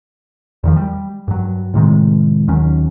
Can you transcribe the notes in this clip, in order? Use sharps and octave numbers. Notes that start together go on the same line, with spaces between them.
E2 D#3 F3
G3
G2 F#3
A2 C3 D#3 G#3
D#2 D#3 F#3 C#4